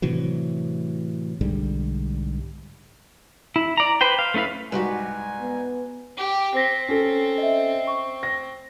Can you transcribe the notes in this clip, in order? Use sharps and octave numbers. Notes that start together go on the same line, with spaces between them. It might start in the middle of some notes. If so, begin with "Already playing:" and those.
A2 C3 E3 F#3
B1 G#2 D3 G3
E4
D5 A#5
B4 C5 G5
F5
A3 C#4 E4 B4 F5
C2 G#2 F#4 G4 B4 G#5
B3
G4
C4 C5 A#6 B6
C#4 A4
D#5 E5
C#6
A#6